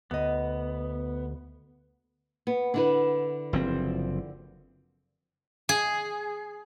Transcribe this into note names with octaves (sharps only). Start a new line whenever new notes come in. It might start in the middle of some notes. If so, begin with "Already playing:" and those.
D2 B3 D#5
B3
D3 E4 B4
F#1 F3 C4
G#4